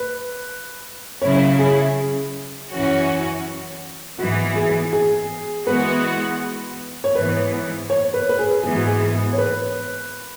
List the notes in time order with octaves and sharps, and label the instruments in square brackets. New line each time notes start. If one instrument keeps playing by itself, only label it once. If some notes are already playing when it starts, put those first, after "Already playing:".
Already playing: [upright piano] B4
[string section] C#3 F#3 E4 [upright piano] C#5
[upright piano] G#4
[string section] F#2 E3 C#4 F#4
[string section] G#2 E3 B3 [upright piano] F#4
[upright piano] G#4
G#4
[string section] E3 G#3 B3 F#4 [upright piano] B4
[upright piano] C#5
[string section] G#2 E3 B3 [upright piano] B4
[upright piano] C#5
B4
B4
G#4
[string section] G#2 E3 B3 [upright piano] G#4
[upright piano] F#4
G#4
C#5
B4